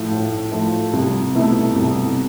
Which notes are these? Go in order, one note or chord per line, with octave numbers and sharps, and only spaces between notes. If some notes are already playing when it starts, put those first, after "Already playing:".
Already playing: A2 F3 A3 E4
A2
F3 A3 E4
C2
B2 A3 E4
C2